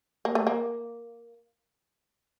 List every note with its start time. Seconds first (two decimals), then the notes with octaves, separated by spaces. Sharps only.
0.25 A#3
0.35 A3
0.47 A#3